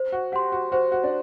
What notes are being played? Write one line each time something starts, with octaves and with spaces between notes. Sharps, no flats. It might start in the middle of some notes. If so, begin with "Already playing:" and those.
Already playing: C5
F#4
G4 F#5 C6
F#4
F#4 C5
F#4
D4